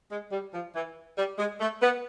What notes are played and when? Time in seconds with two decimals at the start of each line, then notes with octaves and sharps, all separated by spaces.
0.11 G#3
0.32 G3
0.54 F3
0.75 E3
1.18 G3
1.39 G#3
1.61 A3
1.82 B3